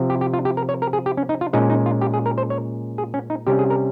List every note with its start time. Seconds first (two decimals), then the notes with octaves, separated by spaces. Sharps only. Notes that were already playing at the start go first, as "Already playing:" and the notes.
Already playing: C3 F3 C4
0.10 G4
0.21 G4
0.34 F4
0.45 G4
0.57 A#4
0.69 C#5
0.82 A#4
0.93 G#4
1.06 G4
1.17 C#4
1.29 D#4
1.41 F4
1.53 A#2 G#3 C#4 D#4
1.70 D#4
1.86 F4
2.01 G4
2.14 G#4
2.26 A#4
2.38 C5
2.50 C#5
2.98 G#4
3.14 C#4
3.30 D#4
3.47 C3 G3 C#4 G4
3.59 G#4
3.70 A#4